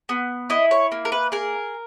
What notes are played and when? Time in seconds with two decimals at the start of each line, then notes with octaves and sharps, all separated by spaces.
0.09 B3
0.50 E4 D#5
0.71 C#5
0.92 A#3
1.05 A#4
1.12 B4
1.32 G#4 A#4